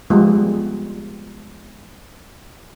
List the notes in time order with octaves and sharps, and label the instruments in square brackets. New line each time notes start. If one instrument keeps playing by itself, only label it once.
[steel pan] F3 G3 G#3 B3 F4